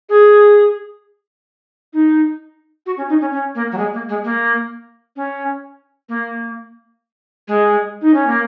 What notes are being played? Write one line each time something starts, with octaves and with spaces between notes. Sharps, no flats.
G#4
D#4
F#4
C#4
D#4
C#4
C#4
A#3
F#3
G#3
A#3
G#3
A#3
C#4
A#3
G#3
D#4
C#4
A#3